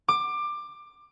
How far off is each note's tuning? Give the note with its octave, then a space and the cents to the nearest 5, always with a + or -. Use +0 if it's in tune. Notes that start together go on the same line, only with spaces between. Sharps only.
D6 +20